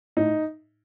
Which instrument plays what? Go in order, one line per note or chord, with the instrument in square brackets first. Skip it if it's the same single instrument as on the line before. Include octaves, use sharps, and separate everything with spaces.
[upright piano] A2 D#4